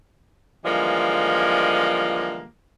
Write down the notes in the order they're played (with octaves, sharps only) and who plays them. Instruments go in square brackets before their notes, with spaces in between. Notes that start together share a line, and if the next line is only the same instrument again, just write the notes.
[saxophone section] D3 E3 F3 G3 G#3 A#3